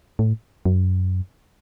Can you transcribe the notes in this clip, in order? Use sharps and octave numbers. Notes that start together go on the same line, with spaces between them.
A2
F#2